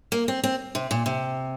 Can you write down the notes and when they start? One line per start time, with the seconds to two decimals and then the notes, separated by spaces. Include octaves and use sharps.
0.12 A#3
0.28 C4
0.44 C4
0.75 C3
0.91 A#2
1.06 C3